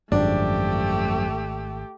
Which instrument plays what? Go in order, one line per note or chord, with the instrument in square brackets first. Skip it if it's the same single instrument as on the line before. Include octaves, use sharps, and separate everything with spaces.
[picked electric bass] G#1 [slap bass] F#2 F3 [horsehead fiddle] A3 G4 [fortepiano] D4